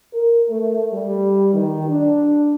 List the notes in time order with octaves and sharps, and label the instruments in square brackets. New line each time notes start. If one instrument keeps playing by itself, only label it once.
[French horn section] A#4
A3
G3
D#3
D4